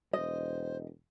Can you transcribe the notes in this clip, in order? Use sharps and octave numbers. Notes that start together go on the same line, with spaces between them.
E1 C5 D#5